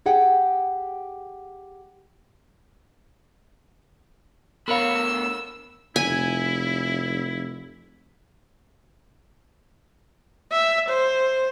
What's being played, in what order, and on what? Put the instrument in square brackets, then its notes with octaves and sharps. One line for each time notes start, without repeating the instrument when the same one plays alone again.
[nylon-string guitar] G4 G#4 F#5 G5
[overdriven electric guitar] D2 B5 [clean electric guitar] B3 C#5 [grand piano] A#4 F5 [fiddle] E6
[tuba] F1 [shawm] E4 [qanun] G#5
[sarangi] E5
C5